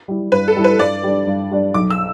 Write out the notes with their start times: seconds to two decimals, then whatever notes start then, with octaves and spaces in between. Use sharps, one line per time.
0.08 G3 E4
0.32 G2 B4
0.48 A4
0.56 G3 E4
0.64 B4
0.79 G2 D5
1.04 G3 D4
1.27 G2
1.51 G3 D4
1.74 B1 D6
1.90 E6